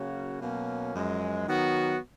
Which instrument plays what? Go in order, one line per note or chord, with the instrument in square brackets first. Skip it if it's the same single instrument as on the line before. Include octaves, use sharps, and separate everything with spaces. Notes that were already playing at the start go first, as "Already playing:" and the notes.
Already playing: [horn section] C#3 F#3 A#3 C#4 F#4
B2 F#3 A#3 C#4
F#2 F3 G#3
D#3 F#3 B3 F#4